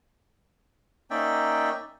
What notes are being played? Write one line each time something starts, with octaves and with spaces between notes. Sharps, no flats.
A#3 C#4 D#4 D5 E5 G5